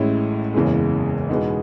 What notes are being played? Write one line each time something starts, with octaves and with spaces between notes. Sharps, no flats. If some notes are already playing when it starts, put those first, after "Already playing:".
Already playing: A1 A2 G#3 C#4 E4
F#1 E2 C#3 E3 G#3
E2 B2 G#3 B3 D#4